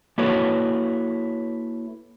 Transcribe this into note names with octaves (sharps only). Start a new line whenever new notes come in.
A#3 E4 F#4 A4 B4 C#5